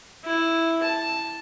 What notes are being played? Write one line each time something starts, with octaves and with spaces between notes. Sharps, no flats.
E4
A5